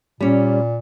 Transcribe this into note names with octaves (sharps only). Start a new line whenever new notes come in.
A#2 G3 C#4